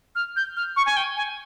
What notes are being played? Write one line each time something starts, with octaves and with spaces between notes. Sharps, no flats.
F6
G6
F6
C#6
G#5
G5
G#5